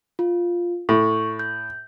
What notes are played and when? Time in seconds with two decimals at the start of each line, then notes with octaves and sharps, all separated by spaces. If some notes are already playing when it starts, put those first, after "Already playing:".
0.19 F4
0.89 A2 C#6
1.39 G6